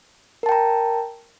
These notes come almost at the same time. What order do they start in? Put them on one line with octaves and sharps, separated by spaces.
A#4 A5 G5 A#5